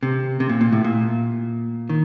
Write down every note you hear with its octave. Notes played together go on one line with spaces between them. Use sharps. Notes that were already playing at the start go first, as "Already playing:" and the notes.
C3
C3
A#2
A#2
A2
A#2
D#3